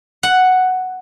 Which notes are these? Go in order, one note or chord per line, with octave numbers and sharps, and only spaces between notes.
F#5